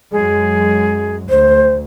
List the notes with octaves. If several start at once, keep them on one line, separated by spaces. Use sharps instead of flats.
F#2 F#3 G#3 G#4
D2 C5